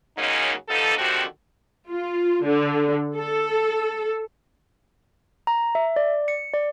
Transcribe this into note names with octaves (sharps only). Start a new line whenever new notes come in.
C#3 F#3 G#3 A#3 C#4 D#4
G2 F3 B3 D#4 A4
D3 D#3 F3 C4 F#4 G4
F4
D3
A4
A#5
E5
D5
C#7
D5